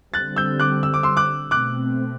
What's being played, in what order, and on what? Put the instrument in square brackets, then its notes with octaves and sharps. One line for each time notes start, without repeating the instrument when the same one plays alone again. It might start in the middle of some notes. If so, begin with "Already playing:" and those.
[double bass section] D3 G3 C4 [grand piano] F#6 A6
[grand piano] E6 G6
D6 F#6
E6
D6
C6 E6
D6 F#6
[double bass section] B2 A3 C4 [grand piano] D6 F#6